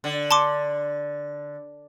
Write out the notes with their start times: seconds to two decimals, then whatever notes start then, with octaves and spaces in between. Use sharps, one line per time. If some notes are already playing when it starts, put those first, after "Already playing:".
0.04 D3
0.31 A5 C6 D6